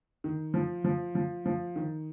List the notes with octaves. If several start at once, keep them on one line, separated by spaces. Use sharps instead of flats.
D#3
F3
F3
F3
F3
D#3